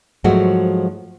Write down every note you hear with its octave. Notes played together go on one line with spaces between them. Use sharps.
G#2 F3 F#3 G#3 A3 F#4